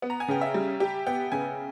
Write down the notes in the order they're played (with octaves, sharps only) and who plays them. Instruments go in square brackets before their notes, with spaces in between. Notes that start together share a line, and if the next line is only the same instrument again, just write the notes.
[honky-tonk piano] B3
[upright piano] A#5
G#5
[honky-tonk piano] C#3 [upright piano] G5
[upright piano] E5
[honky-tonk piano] G3
[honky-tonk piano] G4 [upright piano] G5
[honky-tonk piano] B3 [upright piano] G5
[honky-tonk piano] C#3 [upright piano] G#5